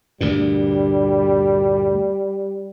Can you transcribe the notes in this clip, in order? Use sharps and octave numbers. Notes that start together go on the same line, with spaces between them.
D2 G2 A#2 G3